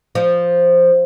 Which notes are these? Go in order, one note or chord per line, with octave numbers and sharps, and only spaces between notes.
F3